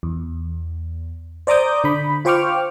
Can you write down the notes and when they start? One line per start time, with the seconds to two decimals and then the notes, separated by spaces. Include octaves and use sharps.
0.03 E2
1.47 C5 D5 A#5 D6 D#6 G6
1.84 D3 B5
2.25 F4 C5 G5 C#6 D6 F6